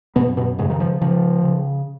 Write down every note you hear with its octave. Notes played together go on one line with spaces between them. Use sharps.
F#2 B2 B3
B2 B3
G#2 C#3 G#3
D#3
F3
C#3 F3
C#3